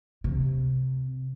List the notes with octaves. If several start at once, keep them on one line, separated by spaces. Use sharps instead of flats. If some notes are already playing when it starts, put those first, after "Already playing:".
C3